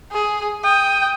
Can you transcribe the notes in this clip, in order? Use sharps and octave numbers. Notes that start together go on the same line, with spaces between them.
G#4
G5 D#6